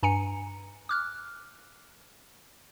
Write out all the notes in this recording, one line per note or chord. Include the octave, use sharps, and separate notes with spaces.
G2 G#5 A#5 C#7
D6 F6 F#6